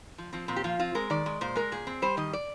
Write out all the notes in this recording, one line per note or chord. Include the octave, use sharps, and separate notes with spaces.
F3
F3 C4
A#2 C4
G4
F3 F4
C4 F4
G#3 A#4
D#3 D5
G#3
A#2 C5
G#3 A#4
A#2 G#4
C4
G3 C5
D#3 D#5
D5